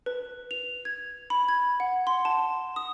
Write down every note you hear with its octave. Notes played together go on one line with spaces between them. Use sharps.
B4
F7
G#6
B5
G#6
F#5
C6
A5
D#6